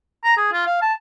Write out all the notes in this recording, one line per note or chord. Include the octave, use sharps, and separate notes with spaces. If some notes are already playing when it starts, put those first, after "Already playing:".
A#5
G#4
F4
F5
A5